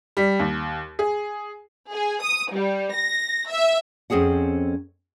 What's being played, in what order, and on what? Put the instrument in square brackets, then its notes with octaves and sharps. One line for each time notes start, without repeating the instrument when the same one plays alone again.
[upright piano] G3
D#2
G#4
[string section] G#4
D#6
G3
A#6
E5
[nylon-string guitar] F2 C4 C#4 G#4 F#5